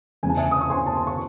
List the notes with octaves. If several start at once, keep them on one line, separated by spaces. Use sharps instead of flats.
E2 C#3 G#3 C4 G#5
A5
E5 G#5
D#6
C#6
G#5 C6
A5
C6
C#6